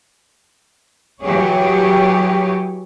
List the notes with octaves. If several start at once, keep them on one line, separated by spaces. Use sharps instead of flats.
E3 F#3 G4 G#4 C#5